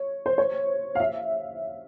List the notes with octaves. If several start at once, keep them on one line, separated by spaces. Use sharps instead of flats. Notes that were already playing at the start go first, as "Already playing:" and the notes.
Already playing: C#5
C5
C#5
F5
E5